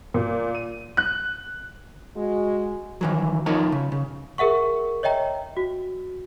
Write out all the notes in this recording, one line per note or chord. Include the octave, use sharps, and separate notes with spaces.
A#2
D#7
F#6
G#3 F#4
D#3 E3 F#3
F3 D#4 A#4 C#5 A5
C#3
C#3
G#4 A#4 E5 F#5 C#6
C#5 D#5 E5 G5 A#5
F#4